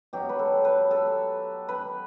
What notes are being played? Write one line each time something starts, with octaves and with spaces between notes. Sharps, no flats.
B2 F#3 G4
B4
A4
B4
A4
B4